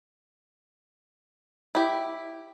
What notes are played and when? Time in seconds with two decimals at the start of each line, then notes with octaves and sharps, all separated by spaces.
1.75 E4 G4